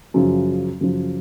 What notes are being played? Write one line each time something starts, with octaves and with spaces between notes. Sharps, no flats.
F#2 C#3 F3
F#2 C#3 F3